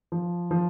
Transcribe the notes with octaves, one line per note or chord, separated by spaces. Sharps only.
F3
F3